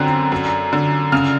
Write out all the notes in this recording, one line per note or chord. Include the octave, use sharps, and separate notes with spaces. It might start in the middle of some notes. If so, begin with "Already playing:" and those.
Already playing: F#2 D3 C4 F#6
F#2
D3
C#3 F6